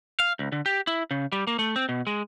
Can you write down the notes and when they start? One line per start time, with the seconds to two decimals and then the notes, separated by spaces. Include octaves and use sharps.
0.20 F5
0.39 C#2
0.52 D3
0.66 G4
0.87 E4
1.11 C#3
1.32 G3
1.47 A#3
1.59 A3
1.76 C4
1.89 B2
2.07 G#3